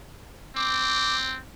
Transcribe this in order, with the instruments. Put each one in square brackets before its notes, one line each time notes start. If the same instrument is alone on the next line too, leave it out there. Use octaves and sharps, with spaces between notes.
[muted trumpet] C4 [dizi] D6